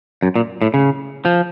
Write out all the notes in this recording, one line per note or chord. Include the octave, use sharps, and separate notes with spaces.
F#2
A#2
A2
C#3
F3